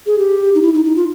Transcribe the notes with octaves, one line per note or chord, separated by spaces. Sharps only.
G#4
G4
D#4
E4
D#4
D#4
F4